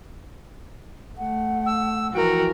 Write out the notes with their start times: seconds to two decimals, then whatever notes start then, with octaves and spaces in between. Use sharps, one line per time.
1.18 A3 F#5
1.66 E6
2.14 E3 F3 F#4 A#4 G5